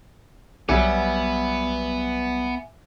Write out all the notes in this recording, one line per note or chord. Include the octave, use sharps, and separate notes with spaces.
B1 F#3 G3 B3 E5 G#5 D6